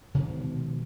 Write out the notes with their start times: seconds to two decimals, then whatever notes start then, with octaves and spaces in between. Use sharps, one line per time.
0.15 B2 D#3 F3 G#3